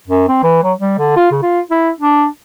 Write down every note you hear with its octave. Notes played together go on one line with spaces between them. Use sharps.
F#2
C4
E3
F#3
G3
D3
F4
C#3
F4
E4
D4